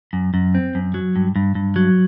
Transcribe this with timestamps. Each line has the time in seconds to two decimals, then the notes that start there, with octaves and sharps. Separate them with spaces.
0.13 F#2
0.34 F#2
0.55 C4
0.75 F#2
0.94 F#3
1.16 G2
1.36 G2
1.55 G2
1.76 F#3